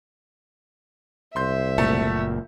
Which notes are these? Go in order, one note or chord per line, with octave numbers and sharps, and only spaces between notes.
C2 E5 C6 G6
F#1 A#2 A3